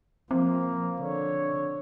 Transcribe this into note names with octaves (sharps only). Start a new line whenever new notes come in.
F3 A#3 C4
D3 C#5